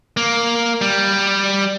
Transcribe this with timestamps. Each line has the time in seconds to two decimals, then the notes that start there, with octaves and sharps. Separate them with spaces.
0.17 A#3
0.81 G3